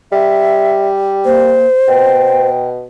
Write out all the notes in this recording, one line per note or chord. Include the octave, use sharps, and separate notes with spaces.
G3 E5
A#3 C5
B2 G5